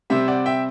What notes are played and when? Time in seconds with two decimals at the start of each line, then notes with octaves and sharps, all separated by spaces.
0.10 C3 G3 C4 E5
0.28 D5 F#5
0.46 E5 G5